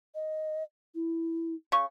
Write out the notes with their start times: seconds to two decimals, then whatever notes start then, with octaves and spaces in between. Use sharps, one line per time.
0.15 D#5
0.95 E4
1.72 C#3 C#6